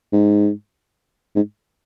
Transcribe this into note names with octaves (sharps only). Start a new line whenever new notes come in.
G#2
G#2